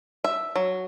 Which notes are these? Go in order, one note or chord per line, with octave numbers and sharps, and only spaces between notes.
E5
F#3